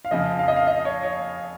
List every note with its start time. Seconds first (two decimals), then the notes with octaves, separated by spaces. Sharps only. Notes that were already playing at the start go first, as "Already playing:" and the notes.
0.05 F5
0.11 F2 C#3 F3 D#5
0.39 F5
0.48 D#5
0.56 F5
0.67 D#5
0.85 C#5
1.03 C#5